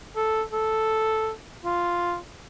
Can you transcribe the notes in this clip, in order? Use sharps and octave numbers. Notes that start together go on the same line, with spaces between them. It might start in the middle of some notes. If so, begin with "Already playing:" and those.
A4
A4
F4